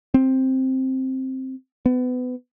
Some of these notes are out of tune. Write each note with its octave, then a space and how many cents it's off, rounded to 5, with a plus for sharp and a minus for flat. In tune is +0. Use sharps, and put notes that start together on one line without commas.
C4 +5
B3 +25